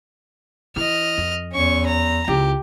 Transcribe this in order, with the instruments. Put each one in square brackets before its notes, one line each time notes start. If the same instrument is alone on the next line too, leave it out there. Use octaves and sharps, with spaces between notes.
[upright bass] E3 [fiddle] D#5 F6
[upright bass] F2
[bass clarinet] E2 [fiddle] C#4 C#6
[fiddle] A#5
[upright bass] C#2 E4 [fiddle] G4